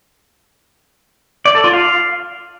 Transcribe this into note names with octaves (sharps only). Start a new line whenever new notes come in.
D5
A4
F4
F5